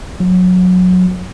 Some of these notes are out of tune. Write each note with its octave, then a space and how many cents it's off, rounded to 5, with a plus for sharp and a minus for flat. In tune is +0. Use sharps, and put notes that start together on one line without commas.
F#3 -20